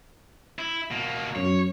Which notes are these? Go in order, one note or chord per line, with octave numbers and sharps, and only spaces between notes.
E4
B2 A#3
F#2 C#5